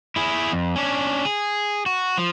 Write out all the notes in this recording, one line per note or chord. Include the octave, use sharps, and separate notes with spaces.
E4 G#4
F2
C#4 D4
G#4
F#4
F3